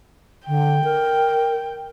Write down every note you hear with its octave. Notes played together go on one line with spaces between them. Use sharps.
D3 G5
A#4